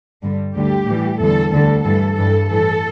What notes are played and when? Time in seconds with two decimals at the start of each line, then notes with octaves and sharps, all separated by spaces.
0.23 G2 D3 G3
0.55 D2 D3 G3 G4
0.87 A2 E3 G3
1.20 E2 D3 G3 A4
1.52 D2 D3 G3 A4
1.85 G2 E3 G3 A4
2.17 G2 E3 G3 A4
2.49 A2 E3 G3 A4